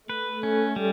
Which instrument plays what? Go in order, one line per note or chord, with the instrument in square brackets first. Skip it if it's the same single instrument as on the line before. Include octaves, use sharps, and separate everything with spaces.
[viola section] A3 [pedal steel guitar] B4
[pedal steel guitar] C#4
G3